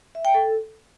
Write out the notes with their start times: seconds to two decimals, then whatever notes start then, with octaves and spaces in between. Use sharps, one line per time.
0.15 E5
0.25 G5
0.34 A4